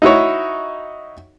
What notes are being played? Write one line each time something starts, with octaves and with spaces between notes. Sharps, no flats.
D#4 E4 F#4 C#5